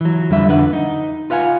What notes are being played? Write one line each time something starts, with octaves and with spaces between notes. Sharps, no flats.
E3 F#3
F2 D3 G3 E5
F2 D3 D4 B4 F#5
D#4
F4 B4 F5 F#5 G#5